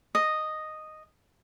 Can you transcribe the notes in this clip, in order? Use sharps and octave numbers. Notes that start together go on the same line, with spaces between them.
D#5